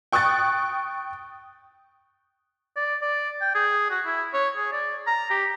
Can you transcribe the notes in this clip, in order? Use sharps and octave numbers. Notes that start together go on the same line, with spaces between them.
G5 C#6 D#6 F#6 A6
D5
D5
G5
G#4
F#4
E4
C#5
G#4
D5
A#5
G4